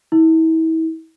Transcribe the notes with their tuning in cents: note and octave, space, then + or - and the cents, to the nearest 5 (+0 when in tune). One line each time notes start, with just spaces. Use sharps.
E4 -35